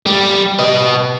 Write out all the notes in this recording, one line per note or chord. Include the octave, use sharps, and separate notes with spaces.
G3
B4 D#5